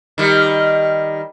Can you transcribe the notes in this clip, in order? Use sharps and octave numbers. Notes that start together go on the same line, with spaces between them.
D#3 G3